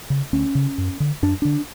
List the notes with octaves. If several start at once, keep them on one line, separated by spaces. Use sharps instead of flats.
C#3
D2 C#4
C#3
F#2
D3
F#2 D4
D3 D4